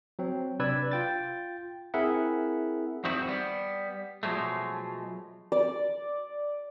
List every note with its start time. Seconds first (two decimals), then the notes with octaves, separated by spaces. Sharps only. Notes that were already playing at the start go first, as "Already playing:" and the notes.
0.19 F#3 C4
0.59 C3 D4 B4 D5 E6 G#6
0.92 F4 G5 A6
1.94 C4 E4 G#4 A#4 E5 F#5
3.04 F2 D#3 C4 E4 F#4
3.27 G3 B3
4.23 B2 F3 F#3 G#3 A3
5.52 D5